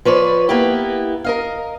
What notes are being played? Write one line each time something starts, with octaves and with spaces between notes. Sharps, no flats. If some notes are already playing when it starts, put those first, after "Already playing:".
F3 B4 C#5 D5
A#3 B3 E4 G4
A#4 D#5 F5